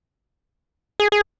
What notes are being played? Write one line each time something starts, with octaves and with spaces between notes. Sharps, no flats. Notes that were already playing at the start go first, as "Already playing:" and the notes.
G#4
G#4